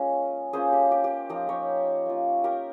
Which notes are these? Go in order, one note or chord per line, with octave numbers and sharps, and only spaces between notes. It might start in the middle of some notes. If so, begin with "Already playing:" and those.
Already playing: G#3 A#3 C#4 F4
A#3 C#4 F4 G#4 C5
G4
G4
G4
F3 A#3 D#4 G4 A#4
A#4 C#5
A#3 F4
G4 A#4